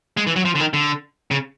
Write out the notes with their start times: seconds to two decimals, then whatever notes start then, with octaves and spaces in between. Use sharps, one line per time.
0.17 G#3
0.27 E3
0.36 F#3
0.45 F3
0.55 D3
0.60 D#3
0.73 D3
1.31 C#3